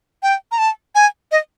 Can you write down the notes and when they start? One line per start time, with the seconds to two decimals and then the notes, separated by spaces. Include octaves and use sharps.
0.23 G5
0.52 A#5
0.58 A5
0.95 G#5
1.32 D#5